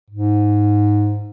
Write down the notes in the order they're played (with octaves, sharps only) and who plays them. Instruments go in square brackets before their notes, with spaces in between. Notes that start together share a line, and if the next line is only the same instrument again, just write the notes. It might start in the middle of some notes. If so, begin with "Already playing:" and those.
[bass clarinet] G#2